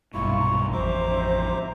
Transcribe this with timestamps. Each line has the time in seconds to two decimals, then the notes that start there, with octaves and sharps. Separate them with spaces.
0.14 B1 G2 A#2 E4 F4 C#6
0.40 A#5 C6
0.73 A1 F2 C5 E5 A#5 D6